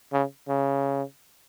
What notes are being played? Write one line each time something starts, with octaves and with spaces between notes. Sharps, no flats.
C#3
C#3